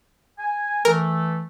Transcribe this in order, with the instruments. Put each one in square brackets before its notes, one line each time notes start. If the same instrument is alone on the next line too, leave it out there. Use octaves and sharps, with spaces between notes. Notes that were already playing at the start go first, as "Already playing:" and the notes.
[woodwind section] G#5
[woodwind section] E3 A3 [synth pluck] A#4